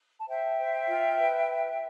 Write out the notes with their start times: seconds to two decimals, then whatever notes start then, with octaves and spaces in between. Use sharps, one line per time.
0.19 A5
0.28 C5 E5 G5
0.58 C5
0.87 F4
1.18 B4